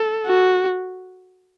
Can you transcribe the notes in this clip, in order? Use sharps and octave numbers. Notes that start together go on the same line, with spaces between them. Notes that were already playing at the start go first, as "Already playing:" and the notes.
Already playing: A4
F#4